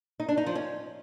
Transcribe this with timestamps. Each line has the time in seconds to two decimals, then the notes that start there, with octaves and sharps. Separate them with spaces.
0.20 D#4
0.29 D4
0.37 D#4
0.46 F3
0.55 C#4